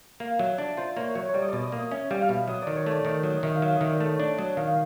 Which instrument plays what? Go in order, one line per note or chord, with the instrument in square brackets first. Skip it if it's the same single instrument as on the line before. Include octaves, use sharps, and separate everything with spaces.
[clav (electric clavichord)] A#3 [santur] F5
[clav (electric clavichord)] F#3 [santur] E5
[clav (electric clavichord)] D4 [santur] D5
[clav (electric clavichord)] F4 [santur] C5
[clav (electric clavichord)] A#3 [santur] C#5
[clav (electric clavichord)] F#3 [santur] C#5
[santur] C#5
[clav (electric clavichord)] G3 [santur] D5
[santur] D#5
[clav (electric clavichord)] B2 [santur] D5
[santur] D#5
[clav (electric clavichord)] A#3 [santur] D#5
[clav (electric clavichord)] C#4 [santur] E5
[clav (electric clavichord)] G3 [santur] F5
[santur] F5
[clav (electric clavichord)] B2 [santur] E5
[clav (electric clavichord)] F#3 [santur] D#5
[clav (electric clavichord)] D#3 [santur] D5
[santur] C#5
[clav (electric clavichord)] A3 [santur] D5
[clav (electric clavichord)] D#3 [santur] D5
[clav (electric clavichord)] F#3 [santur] D#5
[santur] D#5
[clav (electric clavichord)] D#3 [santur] E5
[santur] F5
[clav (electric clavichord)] F#3 [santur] E5
[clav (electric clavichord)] D#3 [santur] D#5
[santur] D5
[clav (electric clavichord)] A3 [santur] C#5
[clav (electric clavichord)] D4 [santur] D5
[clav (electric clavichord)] F#3 [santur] D#5
[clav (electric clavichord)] D#3 [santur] F5